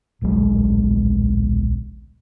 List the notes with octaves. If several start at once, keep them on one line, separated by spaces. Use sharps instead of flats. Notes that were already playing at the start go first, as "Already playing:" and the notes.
D1 A#1 F#3 G#3